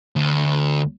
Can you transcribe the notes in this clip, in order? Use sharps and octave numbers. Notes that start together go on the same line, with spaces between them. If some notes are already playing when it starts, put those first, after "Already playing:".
D2